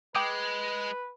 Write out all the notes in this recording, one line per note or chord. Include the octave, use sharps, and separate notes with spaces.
G#3 B4 G5 D6 D#6